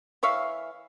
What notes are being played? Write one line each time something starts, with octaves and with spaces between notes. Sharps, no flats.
E3 C#5 E5 F5